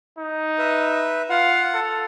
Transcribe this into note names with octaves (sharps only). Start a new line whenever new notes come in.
D#4
B4 E5
F4 F5 F#5
A4